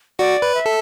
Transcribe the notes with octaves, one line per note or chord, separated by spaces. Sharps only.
F#4 D5
B4
E5
A4